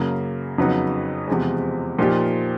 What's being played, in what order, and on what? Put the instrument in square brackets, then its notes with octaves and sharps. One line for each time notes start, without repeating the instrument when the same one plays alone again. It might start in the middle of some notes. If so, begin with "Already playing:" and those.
Already playing: [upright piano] F#2 C#3 F#3 A#3
F2 C#3 F#3 B3 D#4
E2 C3 F3 G#3
A#2 F3 A#3 D#4 G4